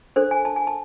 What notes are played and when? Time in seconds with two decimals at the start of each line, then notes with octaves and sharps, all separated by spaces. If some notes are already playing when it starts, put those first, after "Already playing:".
0.16 D4 A4 C5
0.31 G#5
0.45 A5
0.56 G#5
0.67 A5